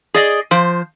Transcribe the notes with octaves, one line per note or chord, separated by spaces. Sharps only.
G#4 D5 D#5
F3 C5